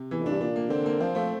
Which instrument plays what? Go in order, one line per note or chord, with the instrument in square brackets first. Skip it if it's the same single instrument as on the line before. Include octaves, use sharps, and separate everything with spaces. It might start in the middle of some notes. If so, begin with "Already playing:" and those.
Already playing: [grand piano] C3
[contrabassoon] E2 [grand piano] E3
[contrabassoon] F2 [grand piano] D4
[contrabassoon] G2
[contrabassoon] A#2 [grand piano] D4
[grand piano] A#3
[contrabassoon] D3 [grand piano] C4
[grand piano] A#3
[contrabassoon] F3 [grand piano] C4
[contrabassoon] F3 [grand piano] A3